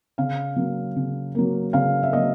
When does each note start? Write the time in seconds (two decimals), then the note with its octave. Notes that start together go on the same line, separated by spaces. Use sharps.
0.18 C#3 F5
0.56 F#3 A#3
0.96 C#3
1.35 F#3 A#3
1.73 C#3 F5
2.03 E5
2.13 F#3 A#3 D#5